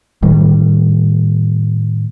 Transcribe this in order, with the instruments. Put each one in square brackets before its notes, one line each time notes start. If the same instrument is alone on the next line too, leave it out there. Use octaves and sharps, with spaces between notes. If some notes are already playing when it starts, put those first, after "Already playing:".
[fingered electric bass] A2 D#3 G3